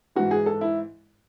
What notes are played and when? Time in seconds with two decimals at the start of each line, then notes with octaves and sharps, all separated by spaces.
0.15 G#2 E3 F#4
0.31 G#4
0.46 A4
0.61 E4